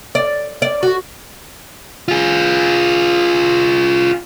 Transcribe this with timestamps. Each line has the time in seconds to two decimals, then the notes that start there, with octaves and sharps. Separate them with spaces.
0.15 D5
0.62 D5
0.83 F#4
2.08 F4 G#4